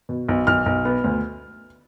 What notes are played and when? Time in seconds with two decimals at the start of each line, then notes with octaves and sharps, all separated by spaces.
0.09 B2
0.28 B1
0.47 B1 F6
0.66 B1
0.85 B3
1.04 D2